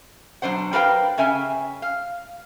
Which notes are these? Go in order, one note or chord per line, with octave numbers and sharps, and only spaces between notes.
B2 F#3 D4 C5 F#5
D4 G4 A#4 B4 F5 G5
C#3 C#4 E5 G5 G#5
F5